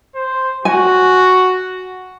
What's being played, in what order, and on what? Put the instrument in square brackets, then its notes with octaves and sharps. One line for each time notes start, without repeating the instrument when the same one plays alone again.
[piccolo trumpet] C5
[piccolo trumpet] F#4 [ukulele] G#5